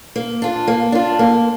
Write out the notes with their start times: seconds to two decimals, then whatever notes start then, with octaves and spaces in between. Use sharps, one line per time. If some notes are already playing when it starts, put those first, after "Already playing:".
0.16 A#3
0.42 D4 F4
0.68 A#3
0.92 D4 F4
1.19 A#3